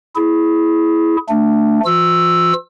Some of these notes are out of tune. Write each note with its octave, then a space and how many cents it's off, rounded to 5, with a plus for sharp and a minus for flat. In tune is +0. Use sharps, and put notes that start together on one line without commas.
E4 +0 G#4 +20
A3 +15 D4 +0
F3 -45 F4 +35 E6 +0